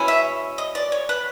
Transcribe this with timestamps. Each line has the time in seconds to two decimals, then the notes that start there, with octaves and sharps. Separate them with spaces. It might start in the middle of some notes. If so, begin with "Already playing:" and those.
Already playing: B2 G#3 C#4 E4
0.08 E5
0.58 D#5
0.75 D5
0.92 C#5
1.09 B4